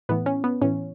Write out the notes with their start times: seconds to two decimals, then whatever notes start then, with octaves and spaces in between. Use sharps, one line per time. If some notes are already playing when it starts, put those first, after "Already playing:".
0.09 A2 E3 B3
0.26 C#4
0.44 B3
0.62 A2 E3 C#4